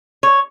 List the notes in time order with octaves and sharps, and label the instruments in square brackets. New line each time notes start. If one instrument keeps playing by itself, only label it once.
[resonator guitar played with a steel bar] C#5